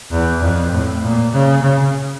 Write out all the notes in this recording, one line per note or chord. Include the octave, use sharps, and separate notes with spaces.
E2
F2
A2
A#2
C#3
C#3